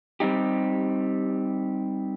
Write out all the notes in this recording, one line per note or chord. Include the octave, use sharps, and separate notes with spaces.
G3 C4 D#4 G4